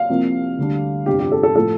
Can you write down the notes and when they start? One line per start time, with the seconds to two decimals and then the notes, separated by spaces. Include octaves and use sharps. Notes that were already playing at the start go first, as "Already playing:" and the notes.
Already playing: F5
0.09 C2 C3 F3 A#3
0.58 D2 D3 G3 D4
1.06 G1 F2 C3 G3 D4 G4
1.19 G4
1.32 A4
1.43 A4
1.56 A2 F3 A3 A4